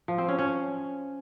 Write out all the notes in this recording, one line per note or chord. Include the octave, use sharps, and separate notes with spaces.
F3
C4
C#4
C#4